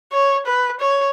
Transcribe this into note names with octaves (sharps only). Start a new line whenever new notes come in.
C#5
B4
C#5